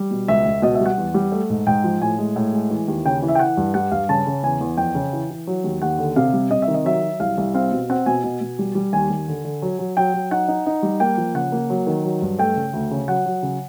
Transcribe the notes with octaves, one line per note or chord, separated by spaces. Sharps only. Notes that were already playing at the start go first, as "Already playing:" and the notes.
Already playing: G3
B2
C#2 E5
C#2
B2 D#5
E5
G3
F#5
E2
G3
A3
G#2
G#2 G5
F3
A2 G#5
G#3
A2
G#3
E3
D#2
C#3 G5
E3
E5
G5
E3 F#5
G2
G3 F#5
G2 F5
C#3 A5
C#3
E2 G#5
E2
F2 G5
C#3
E3
E3
F#3
D#2
D#2 F#5
D3
C3 F5
G3
C3 D#5
E5
D#3
D#5
F#3 E5
F#3
C2 F5
C2
C4 F5
B2
C4 F#5
B2 G#5
B2
B2
G3
G3
D#2 G#5
D#2
D3
D3
F#3
F#3
F#3 G5
F#3
D#4 F#5
D#4
D#4
G3
A#3 G5
F3
C#3 F#5
A#3
F#3
D#3
F#3
G2
A3 G5
C#3
D2
C#3
F#3 F#5
F#3
C#3